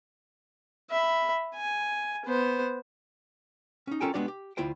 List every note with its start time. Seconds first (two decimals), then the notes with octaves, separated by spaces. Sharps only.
0.90 E5 B5
1.55 G#5
2.25 B3 C5
3.87 C#4 D#4
4.00 C#4 F4 A4 A#4 G5 G#5
4.14 G#3 B3 D4 F#4 G4 D5
4.28 G4
4.57 D2 E4 F4 C5 G5